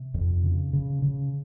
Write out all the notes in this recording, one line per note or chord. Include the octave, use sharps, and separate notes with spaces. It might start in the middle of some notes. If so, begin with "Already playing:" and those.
Already playing: C3
F2
C#3
C#3
C#3